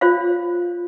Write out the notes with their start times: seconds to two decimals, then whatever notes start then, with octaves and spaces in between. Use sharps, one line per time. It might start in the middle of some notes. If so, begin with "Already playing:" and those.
0.01 F4 C5 C#5 F5